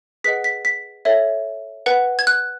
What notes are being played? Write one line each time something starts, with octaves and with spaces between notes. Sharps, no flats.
G#4 B4 D#5 F#5 B6
B6
B6
A4 C#5 E5
B4 F#5
G#6
F#6